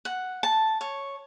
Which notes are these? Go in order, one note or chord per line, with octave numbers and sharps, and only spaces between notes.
F#5
A5
C#5